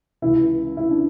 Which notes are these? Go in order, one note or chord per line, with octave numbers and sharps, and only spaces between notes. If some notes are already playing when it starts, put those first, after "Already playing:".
C#2 C#3 E3 E4
E4
D4